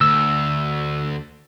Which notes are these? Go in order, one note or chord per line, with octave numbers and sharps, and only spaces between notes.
D2 E6